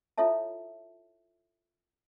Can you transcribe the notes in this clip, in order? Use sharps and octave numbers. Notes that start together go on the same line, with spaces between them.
E4 F4 A4 C#5 E5 A5